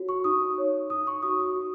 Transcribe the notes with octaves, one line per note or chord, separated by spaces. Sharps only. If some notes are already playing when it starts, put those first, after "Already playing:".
Already playing: F#4 C#5
C#6
D#4 D#6
C#5
D#4 D#6
C#6
F#4 D#6
D#6
F#4